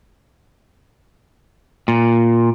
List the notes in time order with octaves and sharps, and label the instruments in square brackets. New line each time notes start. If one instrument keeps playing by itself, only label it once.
[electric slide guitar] A#2